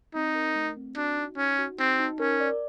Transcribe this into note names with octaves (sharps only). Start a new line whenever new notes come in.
C4 D#4
A#4
A3
C4
D4 F#4
D#4
C#4 D#4
F#4
C4 D#4
D#4
C#4 A#4
D5